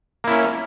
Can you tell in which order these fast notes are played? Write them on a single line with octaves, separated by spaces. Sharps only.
A#3 E4 C#4